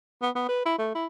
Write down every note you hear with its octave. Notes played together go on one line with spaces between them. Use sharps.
B3
B3
B4
E4
A3
E4